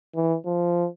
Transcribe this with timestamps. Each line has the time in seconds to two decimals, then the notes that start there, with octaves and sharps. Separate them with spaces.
0.15 E3
0.46 F3